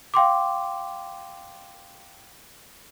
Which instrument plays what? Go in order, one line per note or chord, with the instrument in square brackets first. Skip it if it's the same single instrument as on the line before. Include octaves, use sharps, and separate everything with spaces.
[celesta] F5 G5 C6 D6